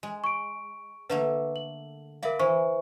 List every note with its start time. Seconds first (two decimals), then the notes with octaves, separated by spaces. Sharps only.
0.03 G#3
0.24 C#6 D7
1.10 D3 A3 A#3 B4
1.56 F#7
2.23 A#4 D5 E5 F5 B5
2.39 E3 C5 C#6